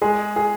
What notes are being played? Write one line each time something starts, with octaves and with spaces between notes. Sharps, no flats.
G#3 G#4
G#4